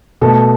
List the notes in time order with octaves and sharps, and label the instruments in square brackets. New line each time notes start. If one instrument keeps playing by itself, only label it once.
[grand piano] B2 A3 A4